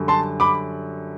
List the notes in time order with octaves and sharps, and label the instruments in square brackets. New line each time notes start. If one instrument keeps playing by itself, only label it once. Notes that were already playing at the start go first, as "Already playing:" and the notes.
Already playing: [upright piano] F#2 D3 G3
A5 C6
B5 D6